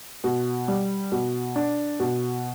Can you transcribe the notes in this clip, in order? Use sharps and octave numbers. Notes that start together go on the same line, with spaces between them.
B2
G3
B2
D4
B2